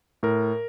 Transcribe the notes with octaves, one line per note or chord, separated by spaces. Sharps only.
A2 A#4